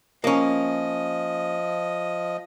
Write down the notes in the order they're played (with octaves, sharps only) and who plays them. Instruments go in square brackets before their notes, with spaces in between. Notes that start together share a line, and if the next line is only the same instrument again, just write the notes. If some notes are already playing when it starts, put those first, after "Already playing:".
[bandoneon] F3 D#5 [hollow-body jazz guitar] A#3 C#4